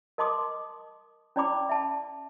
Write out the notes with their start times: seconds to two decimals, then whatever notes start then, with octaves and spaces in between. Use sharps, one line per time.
0.18 A#4 D#5 A5 C6 D6 D#6
1.36 C#4 E4 D5 A5 B5 D6
1.69 E5 A5